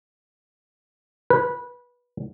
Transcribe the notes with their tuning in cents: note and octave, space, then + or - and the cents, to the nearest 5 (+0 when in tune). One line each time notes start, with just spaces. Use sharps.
B4 -20